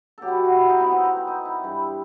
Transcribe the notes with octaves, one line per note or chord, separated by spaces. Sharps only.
B2 F#3 G4 A4
E4
F#4
F#4
E4
D#4
B3
C4
B3
C4
D#4
E4
G2 E3 G3